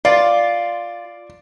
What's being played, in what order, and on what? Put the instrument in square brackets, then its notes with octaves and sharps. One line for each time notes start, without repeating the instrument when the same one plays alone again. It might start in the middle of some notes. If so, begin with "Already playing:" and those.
[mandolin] F4 [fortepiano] D5